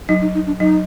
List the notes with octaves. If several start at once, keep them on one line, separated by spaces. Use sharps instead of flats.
F#3 D#4
D#4
D#4
D4
F#3 D#4